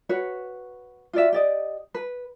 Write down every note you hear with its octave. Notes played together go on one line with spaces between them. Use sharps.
F#4 B4 C#5
F4 F#4 D5 E5
G4 D5 D#5
B4